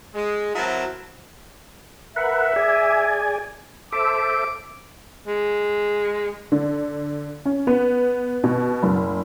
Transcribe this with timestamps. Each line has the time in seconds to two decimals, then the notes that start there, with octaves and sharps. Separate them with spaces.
0.15 G#3
0.55 F#3 C4 E4 A#4 A5
2.16 A#4 B4 E5 F#5
2.56 G#4 D5 G#5
3.92 A4 C5 E5 D6
5.27 G#3
6.52 D3
7.46 C#4
7.67 B3
8.44 B2
8.83 F#1